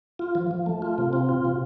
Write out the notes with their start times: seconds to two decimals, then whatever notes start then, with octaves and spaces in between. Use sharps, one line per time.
0.19 F4
0.35 F3
0.51 F3
0.66 A3
0.82 F4
0.98 C3
1.13 C4
1.29 F4
1.45 C3